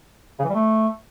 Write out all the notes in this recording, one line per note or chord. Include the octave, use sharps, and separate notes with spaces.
C#3
E3
G3
A3